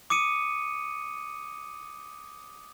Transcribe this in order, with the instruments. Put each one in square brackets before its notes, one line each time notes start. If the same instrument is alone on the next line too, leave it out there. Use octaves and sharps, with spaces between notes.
[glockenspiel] D6 D#6 C#7 D#7